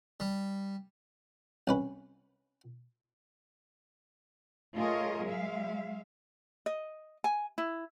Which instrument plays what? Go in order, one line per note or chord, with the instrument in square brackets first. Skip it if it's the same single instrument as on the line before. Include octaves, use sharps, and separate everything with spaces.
[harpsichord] G3
C2 C#4 B4
[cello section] A3 F4 G#4 A#4 C#5 D#5
F#3 G#3 E5 F5
[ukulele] D#5
G#5
E4